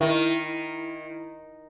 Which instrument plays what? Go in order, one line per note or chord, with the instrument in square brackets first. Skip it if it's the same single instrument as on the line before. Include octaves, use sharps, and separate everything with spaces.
[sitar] D#3 [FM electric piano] E4